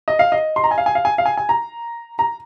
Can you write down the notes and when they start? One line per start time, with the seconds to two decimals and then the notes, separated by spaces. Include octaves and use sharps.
0.08 D#5
0.19 F5
0.32 D#5
0.56 C6
0.64 A#5
0.71 G#5
0.78 F5
0.86 G#5
0.95 F5
1.05 G#5
1.18 F5
1.26 G#5
1.37 G#5
1.49 A#5
2.19 A#5